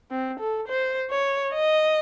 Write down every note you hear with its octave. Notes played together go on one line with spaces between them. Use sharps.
C4
A4
C5
C#5
D#5